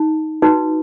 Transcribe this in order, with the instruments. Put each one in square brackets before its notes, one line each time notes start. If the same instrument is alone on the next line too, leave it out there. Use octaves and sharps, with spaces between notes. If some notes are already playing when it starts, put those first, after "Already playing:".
Already playing: [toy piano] D#4
D#4 F#4 B4